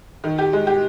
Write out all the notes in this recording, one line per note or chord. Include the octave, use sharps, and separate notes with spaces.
D#3
G4
G#3
G4